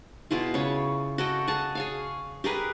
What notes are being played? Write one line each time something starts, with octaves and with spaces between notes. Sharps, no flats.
B2 E4 F4 G#4
C#3 C#5
F#4 A4 D#5 G5
G#4 A5
G#4 C#5 F5
G4 G#4 A#4 B4